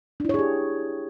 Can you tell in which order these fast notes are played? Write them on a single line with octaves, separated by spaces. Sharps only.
D4 E4 C#5 G#4 G4